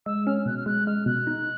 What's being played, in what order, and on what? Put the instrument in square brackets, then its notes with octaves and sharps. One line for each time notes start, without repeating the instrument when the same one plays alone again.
[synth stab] G#3 [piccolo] E6
[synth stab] C#4 [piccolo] F6
[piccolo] F6
[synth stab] B2 [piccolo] F#6
[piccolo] F6
[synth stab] G#3 [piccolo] F#6
[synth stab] G#3 [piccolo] F6
[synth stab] B2 [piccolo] F#6
[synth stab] D#4